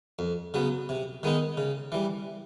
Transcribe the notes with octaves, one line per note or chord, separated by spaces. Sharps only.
F2
C#3 F#3 B3
C3
D#3 G#3 B3 D#4
C#3
E3 G3